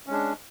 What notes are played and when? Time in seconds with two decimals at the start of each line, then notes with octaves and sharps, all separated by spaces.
0.07 C#4
0.09 G#3
0.12 D4